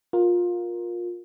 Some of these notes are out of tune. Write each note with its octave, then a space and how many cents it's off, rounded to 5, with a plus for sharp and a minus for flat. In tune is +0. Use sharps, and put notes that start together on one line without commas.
F4 +20 A#4 +15